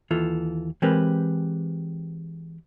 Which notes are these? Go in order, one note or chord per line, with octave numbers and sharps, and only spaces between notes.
D#2 E3 F4 A4
E3 G#3 C4 G4 A#4 B4